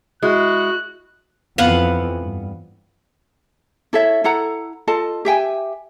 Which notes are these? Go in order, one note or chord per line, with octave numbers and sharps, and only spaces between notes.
G#3 E4 F#4 F#6
F2 E3 B3 F5 F#5
G2
E4 A4 C#5 E5
E4 A4 F#5 A#5
F4 A4 D#5 A5
G4 E5 G5 G#5